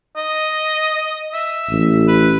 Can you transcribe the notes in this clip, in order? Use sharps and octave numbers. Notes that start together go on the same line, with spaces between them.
D#5
E5
A1
B4